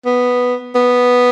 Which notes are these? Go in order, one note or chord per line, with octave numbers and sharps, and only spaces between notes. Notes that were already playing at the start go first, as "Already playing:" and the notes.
B3
B3